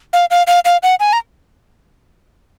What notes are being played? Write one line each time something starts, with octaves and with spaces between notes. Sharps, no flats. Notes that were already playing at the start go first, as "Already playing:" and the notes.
F5
F5
F5
F5
F#5
G#5
A#5